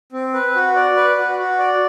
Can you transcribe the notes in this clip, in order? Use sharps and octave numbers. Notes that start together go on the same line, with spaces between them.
C4
B4
F#4
D5
B4
F#4
F#4
D5